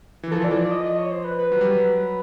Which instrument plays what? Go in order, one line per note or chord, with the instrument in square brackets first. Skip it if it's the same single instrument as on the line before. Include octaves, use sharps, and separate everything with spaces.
[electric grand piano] E3
[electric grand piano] F3 [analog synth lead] A4
[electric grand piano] E3 [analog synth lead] D5
[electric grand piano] F3
[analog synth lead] D5
D#5
D#5
C#5
C5
B4
B4
[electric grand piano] F#3
G3
F#3